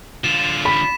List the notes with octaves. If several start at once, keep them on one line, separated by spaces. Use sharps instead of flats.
D3 F4 E7
B5 B6